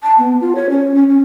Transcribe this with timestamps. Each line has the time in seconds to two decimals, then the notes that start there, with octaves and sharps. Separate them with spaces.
0.03 A5
0.18 B3
0.41 F4
0.55 C#5
0.70 C#4
0.95 C#4
1.08 C#4